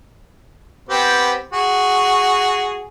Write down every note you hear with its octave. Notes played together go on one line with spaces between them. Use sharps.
B3 C4 G4
F#4 G#4